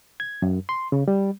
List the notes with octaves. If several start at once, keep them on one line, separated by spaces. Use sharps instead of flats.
G#6
F#2
C6
C#3
G3